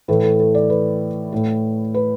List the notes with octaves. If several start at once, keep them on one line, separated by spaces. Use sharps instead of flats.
A2 E3 A3 B4
A4
A4
D5
B4
A2 A3
B4